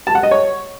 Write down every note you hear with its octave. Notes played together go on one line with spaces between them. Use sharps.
A5
F#5
D#5
C#5